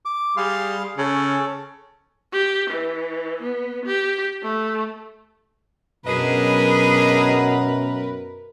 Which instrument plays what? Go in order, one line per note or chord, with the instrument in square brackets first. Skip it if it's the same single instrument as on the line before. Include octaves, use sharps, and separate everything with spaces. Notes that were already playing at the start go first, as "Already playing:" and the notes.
[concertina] D6
[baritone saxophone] G3 [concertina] G#4 F5 C6
[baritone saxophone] C#3 [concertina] C#4 A4
[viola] G4
E3
B3
G4
A3
[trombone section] F#2 B2 [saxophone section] D4 G#4 D#5 [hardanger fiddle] A#4 B4